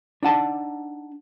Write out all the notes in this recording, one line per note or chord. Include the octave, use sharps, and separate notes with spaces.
D4 D#4 F#5 A5